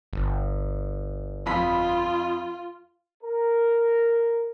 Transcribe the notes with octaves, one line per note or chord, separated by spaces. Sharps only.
G1
F2 F4 B5 B6
A#4